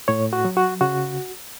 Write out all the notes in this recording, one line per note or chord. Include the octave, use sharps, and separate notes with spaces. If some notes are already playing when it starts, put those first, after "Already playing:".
A2 C#5
F#4
F#3
F#4
C#3 F#4